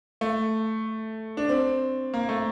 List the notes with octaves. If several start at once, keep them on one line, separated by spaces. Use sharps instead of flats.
A3
D4
C4
A#3
A3